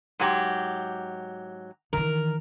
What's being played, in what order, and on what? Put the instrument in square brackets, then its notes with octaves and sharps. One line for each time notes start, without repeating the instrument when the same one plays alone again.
[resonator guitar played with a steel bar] G#2 F#3 G4
[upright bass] D#3 E3 [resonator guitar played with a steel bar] A#4